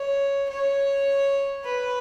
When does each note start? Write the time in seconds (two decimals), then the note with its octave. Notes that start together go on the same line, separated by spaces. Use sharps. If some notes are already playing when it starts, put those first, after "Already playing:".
Already playing: C#5
0.50 C#5
1.65 B4